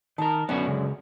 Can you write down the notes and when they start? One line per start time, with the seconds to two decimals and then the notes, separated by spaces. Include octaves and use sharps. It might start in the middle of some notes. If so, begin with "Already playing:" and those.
0.18 D#3 A#4 A5
0.49 F#2 D3 B3 C#4 F#4
0.67 C#3 G#3